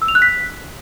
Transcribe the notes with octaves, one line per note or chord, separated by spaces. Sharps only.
E6
F7
F#6
B6